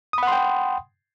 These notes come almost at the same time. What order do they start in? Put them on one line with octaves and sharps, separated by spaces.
D#6 B5 F#5 C6 G5